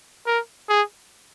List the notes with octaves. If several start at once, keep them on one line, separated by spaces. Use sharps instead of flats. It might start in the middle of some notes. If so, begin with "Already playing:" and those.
A#4
G#4